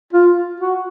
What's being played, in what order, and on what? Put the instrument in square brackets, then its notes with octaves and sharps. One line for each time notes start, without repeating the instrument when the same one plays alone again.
[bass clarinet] F4
F#4